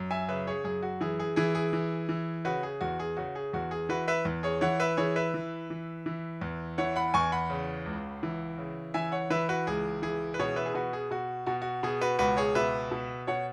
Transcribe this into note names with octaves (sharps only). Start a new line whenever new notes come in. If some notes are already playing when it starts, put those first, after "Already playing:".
Already playing: F#2
E5 G#5
C#3 B4 E5
G#4 C#5
F#2 G#4
F#4
E3 G#4
G#4
E3 G#4
G#4
E3
E3
C#3 F#4 B4
G#4
E2 F#4
G#4
C#3 F#4
G#4
E2 F#4
G#4
E3 F#4 B4
B4 E5
E2
G#4 C#5
E3 C#5 F#5
B4 E5
E3 G#4 C#5
B4 E5
E3
E3
E3
E2
E3 C#5 F#5
F#5 B5
E2 G#5 C#6
F#5 B5
C#3
C#2
E3
C#3
E3 E5 G#5
C#5 F#5
E3 B4 E5
F#4 B4
C#2 G#4
E3 G#4
B4
B2 G#4 C#5
B4 E5
G#4
B2 F#4 B4
G#4
B2 F#4
B2 F#4
F#4
B2 G#4
F#4 B4
C#2 F#4 B4
G#4 C#5
B2 B4 E5
B2
B2 C#5 F#5